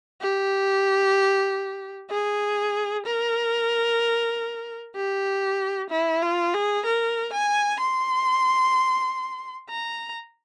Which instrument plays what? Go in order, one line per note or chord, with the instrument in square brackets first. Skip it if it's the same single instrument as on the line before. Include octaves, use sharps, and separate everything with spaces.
[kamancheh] G4
G#4
A#4
G4
E4
F4
G#4
A#4
G#5
C6
A#5